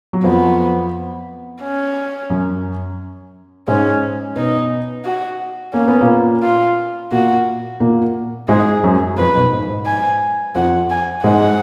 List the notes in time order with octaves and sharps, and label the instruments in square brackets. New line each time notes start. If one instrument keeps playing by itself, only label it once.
[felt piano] F#3
[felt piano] F2 F3 [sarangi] B3
[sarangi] C#4
[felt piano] F#2 F#3
[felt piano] G#2 G#3 [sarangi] C#4
[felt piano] B2 B3 [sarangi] D#4
[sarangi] F#4
[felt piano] A#3 [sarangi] C#4
[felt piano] B3
A#2 A#3
[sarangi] F4
[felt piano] A#2 A#3 [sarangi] F#4
[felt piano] A#2 A#3
[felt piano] G#2 G#3 [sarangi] G#4
[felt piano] F#2 F#3
[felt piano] F2 F3 [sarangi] B4
[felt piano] B1 B2
G#2
G#2
[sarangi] G#5
[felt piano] F2 F3 [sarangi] F#5
[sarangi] G#5
[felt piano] G#2 G#3 [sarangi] F#5